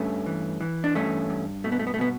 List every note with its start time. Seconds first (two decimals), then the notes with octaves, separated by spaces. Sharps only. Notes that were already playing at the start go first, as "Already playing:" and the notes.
Already playing: G2 A3 C#4
0.26 E3
0.61 E3
0.84 D4
0.95 G2 A3 C#4
1.30 G2
1.64 B2 A3
1.72 B3
1.79 A3
1.87 B3
1.94 A3
1.98 B2 B3